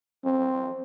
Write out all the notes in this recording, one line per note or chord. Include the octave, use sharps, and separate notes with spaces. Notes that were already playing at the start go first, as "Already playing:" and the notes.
C4